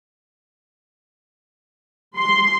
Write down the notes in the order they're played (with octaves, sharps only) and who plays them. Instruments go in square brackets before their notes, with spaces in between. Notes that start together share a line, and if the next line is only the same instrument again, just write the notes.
[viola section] C6